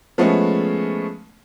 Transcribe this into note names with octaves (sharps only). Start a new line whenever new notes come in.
F3 G#3 A3 B3 C#4